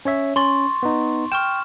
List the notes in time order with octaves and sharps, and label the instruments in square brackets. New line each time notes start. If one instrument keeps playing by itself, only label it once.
[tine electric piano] C#4 C#5 E5
[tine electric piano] C#4 [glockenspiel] C6 C#6 A6
[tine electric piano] B3 D#4
[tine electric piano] G5 [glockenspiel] C#6 F6 E7